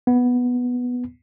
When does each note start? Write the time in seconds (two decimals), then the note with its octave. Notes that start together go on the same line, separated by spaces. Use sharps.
0.07 B3